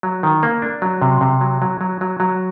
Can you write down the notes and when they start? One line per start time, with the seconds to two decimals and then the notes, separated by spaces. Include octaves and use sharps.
0.03 F#3
0.23 D#3
0.43 A#3
0.62 D4
0.82 F#3
1.02 C3
1.21 C3
1.41 F#3
1.62 F#3
1.81 F#3
2.01 F#3
2.20 F#3